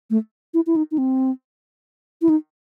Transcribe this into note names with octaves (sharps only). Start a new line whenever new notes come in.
A3
E4
E4
D#4
D#4
C4
E4
D#4